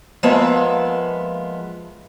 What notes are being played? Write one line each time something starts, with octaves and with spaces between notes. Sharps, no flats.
F3 G#3 A#3 B3 E5 A5